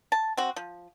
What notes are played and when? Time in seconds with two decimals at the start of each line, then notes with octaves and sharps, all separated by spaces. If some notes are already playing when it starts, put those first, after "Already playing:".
0.12 A5
0.37 C4 F#4
0.56 F3